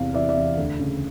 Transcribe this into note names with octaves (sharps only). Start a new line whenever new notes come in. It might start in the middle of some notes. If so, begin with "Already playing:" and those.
Already playing: E2 C3 F5
E3 D5 E5
D5 E5
E2
D2
C#3